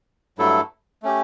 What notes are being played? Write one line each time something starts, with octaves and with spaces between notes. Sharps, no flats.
G2 F#3 A3 E4 A4
A3 C#4 G4